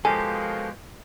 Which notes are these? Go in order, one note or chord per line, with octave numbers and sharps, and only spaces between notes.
B2 D#3 F3 G#3 G4 A4 G#5